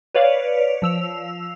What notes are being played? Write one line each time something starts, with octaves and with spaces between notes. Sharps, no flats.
B4 C#5 D5 F5
F3 E6 F7